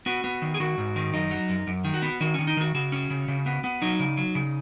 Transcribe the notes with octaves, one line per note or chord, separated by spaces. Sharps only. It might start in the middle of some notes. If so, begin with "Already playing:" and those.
B3 F#4
B3
D#3
G#4
D#3 F#4
G#2
D#3
F#2 D#4
F#3
F#2
F#2
D#3
F#4
B3
D#3 F#4
D#3 C#4
D#4
D#3 F#4
C#3 F#4
C#4
C#3
C#3
B3
B3
F#3 D#4
C#3
F#3
C#3